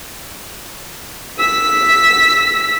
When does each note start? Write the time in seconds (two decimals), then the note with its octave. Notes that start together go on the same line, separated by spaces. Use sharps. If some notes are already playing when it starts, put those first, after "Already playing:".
1.39 E6 B6